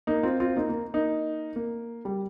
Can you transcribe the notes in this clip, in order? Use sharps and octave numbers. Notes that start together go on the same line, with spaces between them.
A#3 D#4
C4 F4
C4 F4
A#3 D#4
A#3
A#3 D#4
A#3
G3